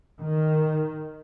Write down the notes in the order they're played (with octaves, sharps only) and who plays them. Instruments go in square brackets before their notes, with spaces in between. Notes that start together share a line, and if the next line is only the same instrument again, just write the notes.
[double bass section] D#3